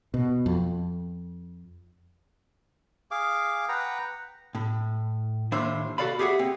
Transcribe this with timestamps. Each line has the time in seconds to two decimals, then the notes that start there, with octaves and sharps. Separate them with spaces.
0.14 B2
0.46 F2
3.11 G#4 F5 D6
3.69 B4 F#5 G5 A#5
4.55 A2
5.52 D#2 A2 D4 C5 E5
5.98 F#4 A4 D5 F5 B5
6.19 G4 G#4 E5 F#5
6.39 C4